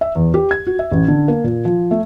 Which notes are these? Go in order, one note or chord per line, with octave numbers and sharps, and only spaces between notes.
E5
E2
G4
G#6
F#4
E5
A1
D3
A#3
A#2
F3
A3